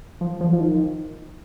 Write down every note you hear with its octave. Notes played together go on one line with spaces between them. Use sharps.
F3
F3
F3
D#3